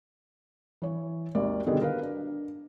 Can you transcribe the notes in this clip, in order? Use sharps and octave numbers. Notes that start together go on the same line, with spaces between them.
E3 C#5
G#1 D#2 A#4 D5
B2 D3 D#3 G3 B3 G#4
A#4 B4 F5
D4